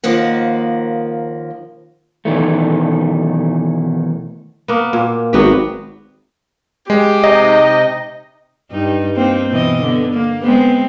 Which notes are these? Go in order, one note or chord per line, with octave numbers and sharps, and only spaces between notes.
D#2 D#3 F3 A#3 F#5
B2 D#3 E3 A3
A#3 B3
A#2
G#1 F#3 B3 G4
G#3 G4
C3 D#4 D#5
G2 D#4
A#3 C4 D#4
B2 E3 D#5
D3 B3
A#3
G#3 B3 C4